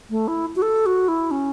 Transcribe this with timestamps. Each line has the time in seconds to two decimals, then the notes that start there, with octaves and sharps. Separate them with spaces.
0.10 A3
0.28 E4
0.56 F#4
0.62 A4
0.86 F#4
1.08 E4
1.31 C#4